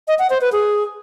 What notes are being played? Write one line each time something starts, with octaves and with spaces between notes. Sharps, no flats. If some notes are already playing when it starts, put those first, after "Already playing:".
D#5
F#5
C5
B4
G#4